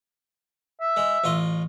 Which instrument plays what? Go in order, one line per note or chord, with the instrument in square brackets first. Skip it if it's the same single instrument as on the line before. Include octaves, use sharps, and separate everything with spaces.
[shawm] E5
[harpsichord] G#3
A1 F4 D#5